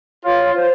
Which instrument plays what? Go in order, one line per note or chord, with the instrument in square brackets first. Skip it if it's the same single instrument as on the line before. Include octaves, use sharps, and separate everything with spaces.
[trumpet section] F4 [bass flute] C#5
[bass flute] C5